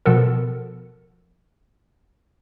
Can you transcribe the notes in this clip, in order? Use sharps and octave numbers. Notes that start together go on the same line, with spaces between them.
B2 F3 B3 A4 A#4